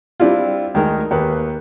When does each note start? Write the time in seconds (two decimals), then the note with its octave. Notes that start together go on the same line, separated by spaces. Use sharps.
0.20 G3 C4 D4 E4 F4
0.74 D2 D#3 G#3 D#4 G#4 A#4
1.11 D#2 A#3 B4